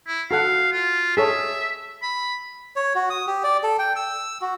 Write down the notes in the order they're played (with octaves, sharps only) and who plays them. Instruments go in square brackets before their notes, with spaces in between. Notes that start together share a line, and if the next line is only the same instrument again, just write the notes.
[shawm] E4
[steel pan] F#4 A4 F#5 [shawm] F5
[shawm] F4
[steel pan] G#4 A4 C#5 [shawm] E5
[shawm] B5
[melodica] C#5
F#4
D#6
G4
D5
A4
G5
E6
F#4